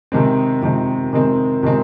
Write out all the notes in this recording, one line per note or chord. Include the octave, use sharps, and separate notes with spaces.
C3 D#3 G#3 C4
C3 D#3 G#3 C4
C3 D#3 G#3 C4
C3 D#3 G#3 C4